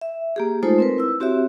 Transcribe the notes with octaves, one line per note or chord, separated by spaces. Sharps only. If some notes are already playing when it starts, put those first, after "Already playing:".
E5
A#3 G4 G#4
G#3 A3 D#4 F4 A4 C5
C4 A#4 B4
E4 E6
C4 F#4 G4 C#5 E5